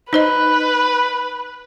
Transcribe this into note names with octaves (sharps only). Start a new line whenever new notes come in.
D#4 B4 C5 D#5